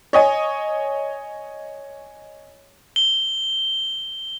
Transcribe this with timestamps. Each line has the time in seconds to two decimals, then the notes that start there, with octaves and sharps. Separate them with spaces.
0.13 C#5 D#5 G#5
2.96 G7